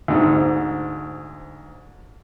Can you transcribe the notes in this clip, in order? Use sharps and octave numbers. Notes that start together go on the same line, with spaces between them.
D2 G#2